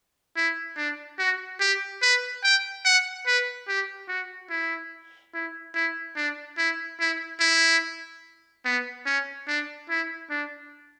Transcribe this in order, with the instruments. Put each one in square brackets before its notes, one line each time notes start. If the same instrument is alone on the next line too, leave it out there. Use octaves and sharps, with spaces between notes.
[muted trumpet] E4
D4
F#4
G4
B4
G5
F#5
B4
G4
F#4
E4
E4
E4
D4
E4
E4
E4
B3
C#4
D4
E4
D4